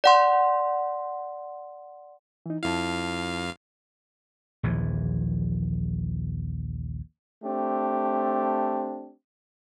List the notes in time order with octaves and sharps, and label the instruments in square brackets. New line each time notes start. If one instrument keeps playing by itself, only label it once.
[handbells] D5 F#5 C6
[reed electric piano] E3 D#4
[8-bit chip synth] F2 F5 [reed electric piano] E4 A5
[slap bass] A#1 D#2 E3 F3
[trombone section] A3 C4 D4 G4